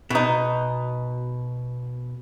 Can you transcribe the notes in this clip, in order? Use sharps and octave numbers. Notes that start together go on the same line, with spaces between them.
B2 D#4